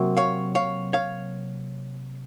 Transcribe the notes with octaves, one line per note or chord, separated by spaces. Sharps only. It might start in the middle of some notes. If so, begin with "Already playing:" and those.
Already playing: C3 F#3 A#3
C#5 F5
C#5 F5
C#5 F5